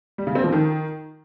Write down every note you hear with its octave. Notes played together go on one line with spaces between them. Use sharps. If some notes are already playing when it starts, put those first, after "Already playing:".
G3
C#3
C4
F3
D#3